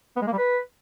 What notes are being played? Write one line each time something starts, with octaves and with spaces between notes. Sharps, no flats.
B3
G#3
A#3
G3
B4